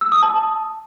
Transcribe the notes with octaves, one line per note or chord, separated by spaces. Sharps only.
E6
D#6
A5